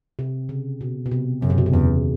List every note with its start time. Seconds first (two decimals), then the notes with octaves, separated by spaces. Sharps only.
0.19 C3
0.49 C#3
0.81 B2
1.06 B2
1.11 C3
1.42 F#2 C#3
1.50 C3
1.58 B2
1.66 C3
1.73 E2 C#3